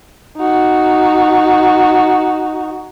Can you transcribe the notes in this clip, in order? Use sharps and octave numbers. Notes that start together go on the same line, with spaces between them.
D#4 F#4